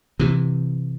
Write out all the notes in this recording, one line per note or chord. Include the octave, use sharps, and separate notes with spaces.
C3 E3